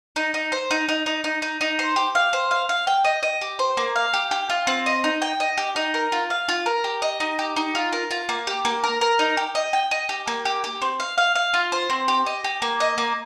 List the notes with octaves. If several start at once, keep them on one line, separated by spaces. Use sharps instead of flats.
D#4
D#4
C5
D#4
D#4
D#4
D#4
D#4
D#4
C5
G4
F5
C5
F5
F5
G5
D#5
D#5
G4
C5
A#3
F5
G4
G4
F4
C4
D#5
D#4
G5
D#5
G4
D#4
A#4
F4
F5
F4
A#4
G4
D#5
D#4
G4
D#4
F4
A#4
F4
A#3
G4
A#3
A#4
A#4
D#4
G4
D#5
G5
D#5
G4
A#3
G4
G4
C4
F5
F5
F5
F4
C5
C4
G4
D#5
G4
A#3
D#5
A#3